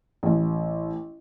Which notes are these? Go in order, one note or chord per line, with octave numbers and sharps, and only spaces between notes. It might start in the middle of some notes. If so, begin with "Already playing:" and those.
A1